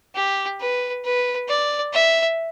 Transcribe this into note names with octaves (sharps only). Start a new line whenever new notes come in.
G4
B4
B4
D5
E5